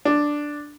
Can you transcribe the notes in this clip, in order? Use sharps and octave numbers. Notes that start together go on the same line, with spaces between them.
D4